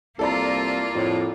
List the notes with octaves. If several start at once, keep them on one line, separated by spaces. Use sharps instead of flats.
C2 A#3 F4 A4 D5 A#5
F2 A2